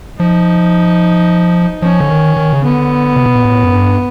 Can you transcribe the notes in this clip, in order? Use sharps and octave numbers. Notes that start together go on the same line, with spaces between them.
F3 D#4
F3 C#4
D3
D#3
D#3
C#3
D3 B3
C3
B2
A#2
A2
F#2
G2